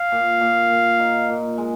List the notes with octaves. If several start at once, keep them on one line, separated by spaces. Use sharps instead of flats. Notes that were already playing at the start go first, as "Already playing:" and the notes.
Already playing: F5
A#2
A#2
A#2
D#4
A#2
G#3